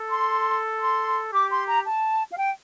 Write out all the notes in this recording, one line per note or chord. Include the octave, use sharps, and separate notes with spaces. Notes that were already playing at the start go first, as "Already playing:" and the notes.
Already playing: A4
C6
C6
G4 D6
C6
A#5
A5
F5
G5